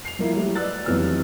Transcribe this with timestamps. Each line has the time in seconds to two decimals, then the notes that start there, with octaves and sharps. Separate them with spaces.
0.05 C7 F7
0.19 F3 A#3 E4
0.33 F#3 G3 A3
0.55 B4 D5 D#5 E6 F#6 A6
0.85 F1 F2 E3 F#3 E6 F6